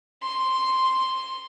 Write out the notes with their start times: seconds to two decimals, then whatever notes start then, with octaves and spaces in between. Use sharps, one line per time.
0.23 C6